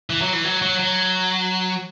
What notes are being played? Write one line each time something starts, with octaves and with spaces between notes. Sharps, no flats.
E3
F#3
E3
F#3
F#3
F#3